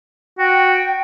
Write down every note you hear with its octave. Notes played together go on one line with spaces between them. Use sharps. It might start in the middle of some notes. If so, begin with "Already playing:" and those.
F#4 G5